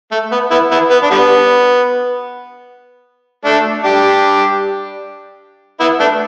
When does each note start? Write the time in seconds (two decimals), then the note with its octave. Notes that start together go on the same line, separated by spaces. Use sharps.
0.12 A3
0.32 B3
0.51 B3 E4
0.71 B3 E4
0.91 B3
1.03 D4
1.11 D3 G3 B3
3.45 A3 D4
3.84 D4 G4
5.80 B3 E4
6.00 A3 D4